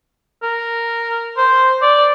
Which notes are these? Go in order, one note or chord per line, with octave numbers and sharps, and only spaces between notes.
A#4
C5
D5